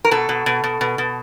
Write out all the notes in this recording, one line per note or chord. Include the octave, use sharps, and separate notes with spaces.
A#4
B2 A4
B2
B2
B2
B2
B2